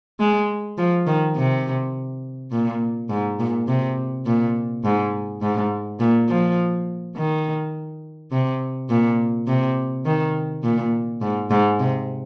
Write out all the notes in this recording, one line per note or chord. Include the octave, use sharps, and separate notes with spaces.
G#3
F3
D#3
C3
A#2
G#2
A#2
C3
A#2
G#2
G#2
A#2
F3
D#3
C3
A#2
C3
D#3
A#2
G#2
G#2
C3